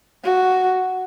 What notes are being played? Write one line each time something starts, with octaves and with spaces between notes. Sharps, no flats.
F#4